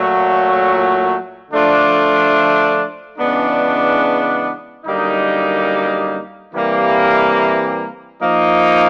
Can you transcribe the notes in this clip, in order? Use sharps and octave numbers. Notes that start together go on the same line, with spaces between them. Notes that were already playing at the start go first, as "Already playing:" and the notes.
Already playing: A#2 F#3 A3
D3 F3 A3 D4 F4
C#3 E3 G#3 B3 D4
F#2 D3 G3 A#3 D#4
C3 E3 G3 A#3
F3 A#3 D#4